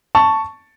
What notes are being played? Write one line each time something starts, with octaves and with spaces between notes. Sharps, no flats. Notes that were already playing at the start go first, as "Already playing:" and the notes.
A5 C#6